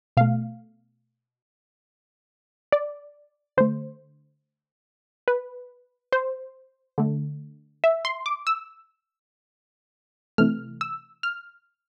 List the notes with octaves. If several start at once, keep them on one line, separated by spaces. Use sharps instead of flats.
B2 A3 F5
D5
D3 A3 C5
B4
C5
D3 A3
E5
C6
D6
E6
C3 E3 A3 F6
E6
F6